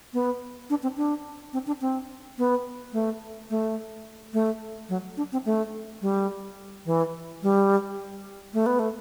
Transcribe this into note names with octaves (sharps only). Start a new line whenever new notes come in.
B3
D4
C4
D4
C4
D4
C4
B3
A3
A3
A3
F#3
D4
C4
A3
G3
E3
G3
A3
B3
A3